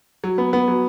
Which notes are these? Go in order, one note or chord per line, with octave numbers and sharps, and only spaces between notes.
F#3
B3
B3
F#3